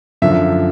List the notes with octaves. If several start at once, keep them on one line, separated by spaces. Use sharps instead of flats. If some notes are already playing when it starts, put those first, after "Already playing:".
F#2 D3 F3 E5